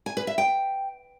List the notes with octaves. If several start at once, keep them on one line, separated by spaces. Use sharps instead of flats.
G#5
B4
E5
G5